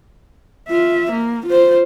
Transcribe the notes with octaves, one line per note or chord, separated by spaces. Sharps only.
F4 E5
A#3
F4 C5